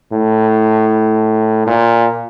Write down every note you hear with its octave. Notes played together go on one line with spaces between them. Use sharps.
A2
A#2